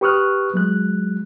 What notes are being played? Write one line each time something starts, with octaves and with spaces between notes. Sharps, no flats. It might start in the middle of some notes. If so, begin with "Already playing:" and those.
G4 B4 C#6 D#6 F6 F#6
F#3 G#3 F#6